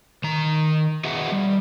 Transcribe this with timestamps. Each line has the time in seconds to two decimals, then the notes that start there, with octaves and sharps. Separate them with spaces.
0.24 D#3 A#5
1.04 F#4 G#4 B4 D#5 E5 F#5
1.32 G3